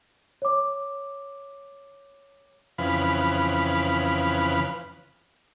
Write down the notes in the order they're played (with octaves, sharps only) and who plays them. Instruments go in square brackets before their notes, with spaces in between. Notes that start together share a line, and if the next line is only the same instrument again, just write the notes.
[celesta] C#5 D6
[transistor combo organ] F2 C#3 E3 B4 F5 B5